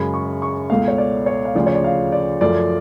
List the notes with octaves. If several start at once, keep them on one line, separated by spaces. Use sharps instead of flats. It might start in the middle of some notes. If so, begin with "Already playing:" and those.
Already playing: F#2 C#3 G#3 B5
C#6
C#6
C#2 B2 A3 F5
C#5
D5
C#5
F5
D2 C#3 F3 D5
C#5
D5
F5
D5
F#2 F3 A3 D5